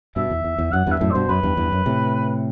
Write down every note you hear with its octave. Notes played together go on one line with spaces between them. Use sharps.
G2 B2 E5
E2
E2
E2
F#2 F#5
E2 G2 E5
F#2 A2
G2 B2 C5
F#2 B4
E2 G2
E2 G2
F#2
A2 C3